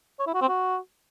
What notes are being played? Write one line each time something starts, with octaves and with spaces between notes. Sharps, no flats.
C#5
E4
F#4
C4
F#4